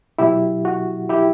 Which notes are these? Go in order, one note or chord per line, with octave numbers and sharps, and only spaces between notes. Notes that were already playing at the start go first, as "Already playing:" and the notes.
B2 F#3 E4 G4
F#4
E4 G4